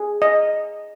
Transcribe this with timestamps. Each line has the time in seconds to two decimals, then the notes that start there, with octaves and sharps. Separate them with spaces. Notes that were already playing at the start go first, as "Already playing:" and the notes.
Already playing: G#4
0.22 D#5